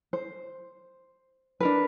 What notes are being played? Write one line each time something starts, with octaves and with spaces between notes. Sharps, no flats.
C5
D4 A#4 B4